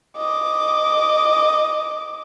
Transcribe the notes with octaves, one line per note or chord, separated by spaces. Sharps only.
D#5 D6